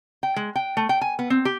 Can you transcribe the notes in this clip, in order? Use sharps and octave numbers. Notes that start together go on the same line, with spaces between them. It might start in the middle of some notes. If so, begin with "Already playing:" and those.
G5
G#3
G5
A3
G5
G#5
B3
C4
G4